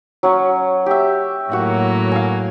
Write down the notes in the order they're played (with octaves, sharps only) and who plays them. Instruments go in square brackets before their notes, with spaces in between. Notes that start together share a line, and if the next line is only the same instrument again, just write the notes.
[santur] F#3 C#4
G4 E5
[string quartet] A2 F#3 A#3 [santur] F#4 F#5
[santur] F5 G#5